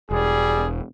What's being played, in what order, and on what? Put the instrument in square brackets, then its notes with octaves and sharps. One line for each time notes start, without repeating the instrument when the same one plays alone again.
[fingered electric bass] E1 [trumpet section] G3 G#4